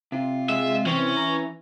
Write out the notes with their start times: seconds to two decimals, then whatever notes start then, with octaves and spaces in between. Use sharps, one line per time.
0.12 C3 F4
0.49 G#3 E5
0.86 E3 C4 C#4
1.17 A#5